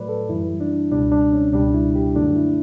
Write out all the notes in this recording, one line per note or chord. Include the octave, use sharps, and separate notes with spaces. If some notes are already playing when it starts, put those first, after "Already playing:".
Already playing: A2 F#3 A3 B4 D5
A4
F#2 E3 G3 E4
D4
C#2 B2 G3 D4
D4
C#4
C#2 B2 G3 D4
E4
G4
F#2 D3 F#3 A3 D4
E4